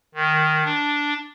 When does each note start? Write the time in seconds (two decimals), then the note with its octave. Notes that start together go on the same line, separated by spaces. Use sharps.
0.14 D#3
0.65 D4